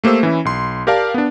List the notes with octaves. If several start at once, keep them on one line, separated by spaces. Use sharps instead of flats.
A3 A#3 G4 C5 E6
E3 C#4 E4
B1 C6
G4 A#4 D5 F5 A5
B3 D4